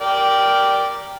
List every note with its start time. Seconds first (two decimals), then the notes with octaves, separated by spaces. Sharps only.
0.01 A#4 D5 G5